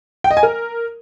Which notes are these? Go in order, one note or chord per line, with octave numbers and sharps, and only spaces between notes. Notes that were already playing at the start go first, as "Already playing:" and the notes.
G5
D#5
G#5
A#4